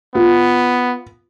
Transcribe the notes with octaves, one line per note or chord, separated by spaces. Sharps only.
B3 F4